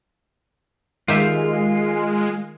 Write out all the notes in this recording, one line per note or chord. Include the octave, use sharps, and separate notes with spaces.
D#3 G#3 F4 G4 E5